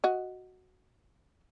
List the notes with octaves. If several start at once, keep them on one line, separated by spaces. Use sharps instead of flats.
F#4 D#5